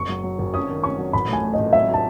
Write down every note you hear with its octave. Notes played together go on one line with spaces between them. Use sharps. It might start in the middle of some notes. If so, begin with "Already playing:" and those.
Already playing: F#1 C#6
F#3
F#3
F#1
C#4 D#6
D#3
C#4 C#6
F#3
A1 B5
A2 G#5
A3
A1 D#5
F#3 E5
F#3
A5